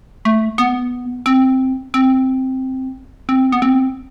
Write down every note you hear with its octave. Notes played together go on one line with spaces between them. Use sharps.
A3
B3
C4
C4
C4
B3
C4